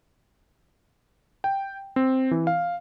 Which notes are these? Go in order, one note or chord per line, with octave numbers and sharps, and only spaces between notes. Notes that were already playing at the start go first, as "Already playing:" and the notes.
G5
C4
E3
F5